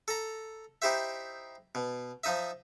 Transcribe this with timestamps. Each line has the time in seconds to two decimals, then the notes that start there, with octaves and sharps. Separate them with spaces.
0.08 A4 A#5
0.82 D#4 E4 G4 C5 E5
1.75 B2
2.24 F3 D#4 D#5 E5